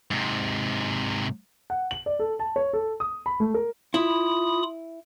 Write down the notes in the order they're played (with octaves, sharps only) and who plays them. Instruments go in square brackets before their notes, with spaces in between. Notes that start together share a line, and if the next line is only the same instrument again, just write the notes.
[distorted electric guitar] G#2 C3
[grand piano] F#5
F#7
D5
A4
A5
C#5
A4
D#6
B5
A3
A#4
[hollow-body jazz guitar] E4 [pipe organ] F4 B5 D#6